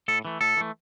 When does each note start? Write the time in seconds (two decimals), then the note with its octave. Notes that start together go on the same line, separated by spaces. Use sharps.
0.08 A2 A4
0.25 E3 A3
0.41 A2 A4
0.57 E3 A3